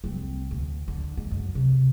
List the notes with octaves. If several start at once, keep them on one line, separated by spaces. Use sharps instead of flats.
C2 C4
D2
D3
G#3
F#2
C3